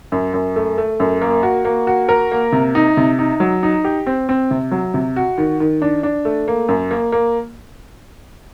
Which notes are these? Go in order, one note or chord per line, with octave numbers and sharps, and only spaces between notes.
F#2
F#2
A3
A3
F#2
A#3
F#4
A#3
F#4
A#4
A#3
C3
D#4
C3
D#4
F#3
D#4
G4
C4
C4
C3
F#3
C3
F#4
D#3
D#3
D4
D4
A3
A#3
F#2
A#3
A#3